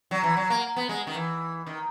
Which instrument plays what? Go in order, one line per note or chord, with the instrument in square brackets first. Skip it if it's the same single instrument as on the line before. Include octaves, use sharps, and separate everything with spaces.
[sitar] F#3
E3
F#3
A#3
B3
G#3
D#3
E3
D#3